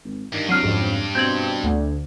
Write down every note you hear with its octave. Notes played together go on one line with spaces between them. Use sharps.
G#1
G2 D#3
C2 F#3 F6 C7 D#7
F2 G#2 C#3
B2 C4 G6 G#6 F#7
D2